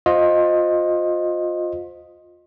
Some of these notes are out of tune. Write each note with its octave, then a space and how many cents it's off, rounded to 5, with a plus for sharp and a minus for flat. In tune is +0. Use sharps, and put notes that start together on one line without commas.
F4 +20 C5 +0 D#5 +0